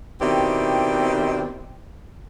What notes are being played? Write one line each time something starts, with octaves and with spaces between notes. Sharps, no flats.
B2 D#3 C4 E4 G4 D5